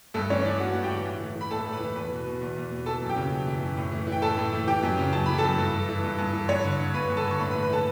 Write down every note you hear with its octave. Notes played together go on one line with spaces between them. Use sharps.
G2 A3 A4
E3 C#4 C#5
E3 D4 D5
G2 F#4 F#5
G2 F#5
G4 G5
E3
A2
E3
E3
B5
A2 A4 A5
A2
B4 B5
E3
E2 B4 B5
B2
B2
E2
E2
B2
E3 A4 A5
F#2
G4 G5
C#3
F#2
E3
F#2
A2
E3
E3
G5
A2 A4 A5
A2
E3
E3 G4 G5
F#2
C#3
F#2 A5
E3 B5
F#2 A4 A5
G2
E3
E3
G2
G2
E3
G2 C#5 C#6
D3
D3
G2 B4 B5
G2
A4 A5
D3
C#6
A2 B4 B5
B4 B5
E3
B4 B5
E3 A4 A5